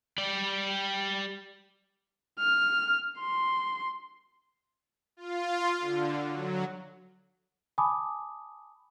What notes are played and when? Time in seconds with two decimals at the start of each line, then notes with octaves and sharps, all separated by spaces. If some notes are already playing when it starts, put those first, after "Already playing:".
0.18 G3 D5
2.39 F6
3.19 C6
5.17 F4
5.80 D3
6.29 F#3
7.78 G#5 A5 B5 D6 D#6